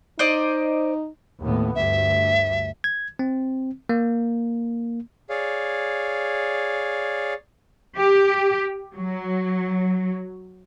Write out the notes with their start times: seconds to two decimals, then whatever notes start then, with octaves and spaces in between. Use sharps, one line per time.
0.19 D#4 C5 D5 D#5
1.40 D#2 A2 B3
1.75 D2 G2 E5
2.84 G#6
3.19 C4
3.89 A#3
5.29 G#4 C#5 D5 F5
7.97 G4
8.94 F#3